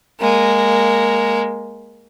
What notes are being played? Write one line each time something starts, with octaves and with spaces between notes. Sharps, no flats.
G#3 A#3